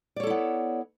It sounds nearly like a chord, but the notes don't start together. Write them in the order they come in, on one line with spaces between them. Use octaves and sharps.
D5 C#5 A4 E4 B3